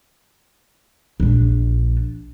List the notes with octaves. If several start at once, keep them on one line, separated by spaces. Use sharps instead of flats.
A#1 D4